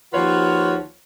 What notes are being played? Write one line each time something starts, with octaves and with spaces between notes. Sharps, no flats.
D#2 F3 F4 F#4 B4 C#5